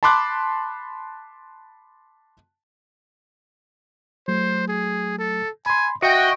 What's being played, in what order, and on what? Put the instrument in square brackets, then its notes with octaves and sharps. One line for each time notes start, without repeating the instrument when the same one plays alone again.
[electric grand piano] A5 B5 C6 D6 F#6
[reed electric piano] F#3 A3 [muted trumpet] C5
[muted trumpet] G#4
A4
[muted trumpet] G#5 [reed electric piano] B5 C6
[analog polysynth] F#4 G5 [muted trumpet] D#5 [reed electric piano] E5